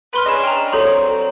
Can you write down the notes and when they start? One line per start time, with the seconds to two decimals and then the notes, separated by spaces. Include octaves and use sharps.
0.13 B4 B5 C6 F6
0.26 C#4 D4 G#4 D#5 E7
0.43 G5 A#5
0.73 D3 F#3 C4 A4 C#5 A#5 C6